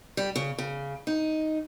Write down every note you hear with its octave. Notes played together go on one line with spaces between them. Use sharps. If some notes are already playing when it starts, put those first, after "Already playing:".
G3
C#3
C#3
D#4